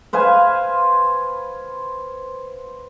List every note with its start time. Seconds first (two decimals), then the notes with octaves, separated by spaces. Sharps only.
0.13 B4 C5 F5 G#5